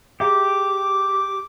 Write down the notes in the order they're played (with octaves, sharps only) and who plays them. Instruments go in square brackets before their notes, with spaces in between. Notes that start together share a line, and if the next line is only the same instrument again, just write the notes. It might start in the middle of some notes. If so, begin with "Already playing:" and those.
[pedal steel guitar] G4 [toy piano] G#4 E5 A#5 [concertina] D6